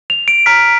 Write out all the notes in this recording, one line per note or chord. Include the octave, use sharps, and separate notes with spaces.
F7
D7
A#5 F6 B6